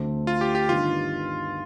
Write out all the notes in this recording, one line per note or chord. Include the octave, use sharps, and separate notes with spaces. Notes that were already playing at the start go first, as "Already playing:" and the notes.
Already playing: D2 D3 A3 C4
F4
G4
G4
G1 G2 D#3 F4